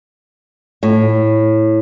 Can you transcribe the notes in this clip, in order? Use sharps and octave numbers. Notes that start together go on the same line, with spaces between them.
A2